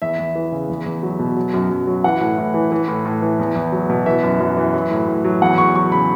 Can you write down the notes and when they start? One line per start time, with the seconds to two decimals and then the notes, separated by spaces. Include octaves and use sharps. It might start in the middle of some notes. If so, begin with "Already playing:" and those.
0.02 E2 E5
0.19 E2
0.35 E3
0.52 C#3
0.69 E2
0.86 E2
1.03 F#3
1.19 B2
1.37 F#3
1.54 F#2
1.70 F#2
1.87 F#3
2.04 E3 F#5
2.21 A2
2.38 A2
2.54 E3
2.72 E3
2.88 A2
3.05 A2
3.22 E3
3.39 E2
3.55 E2
3.72 F#3
3.89 B2
4.06 E3 E5
4.23 F#2
4.40 F#2
4.57 E3
4.74 F#3
4.91 A2
5.08 A2
5.24 F#3
5.42 E2 F#5
5.58 E2 C#6
5.75 F#3 C#6
5.92 C#3 B5